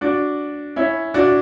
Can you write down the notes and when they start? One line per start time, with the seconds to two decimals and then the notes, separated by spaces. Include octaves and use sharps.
0.01 D4 F#4
0.76 C#4 E4
1.14 D4 F#4